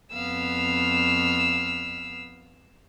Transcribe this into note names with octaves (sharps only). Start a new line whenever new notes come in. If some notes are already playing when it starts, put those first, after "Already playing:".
F2 B3 F5 E6